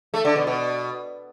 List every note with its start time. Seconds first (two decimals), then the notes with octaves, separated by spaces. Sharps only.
0.14 A3
0.25 D3
0.36 B2
0.47 B2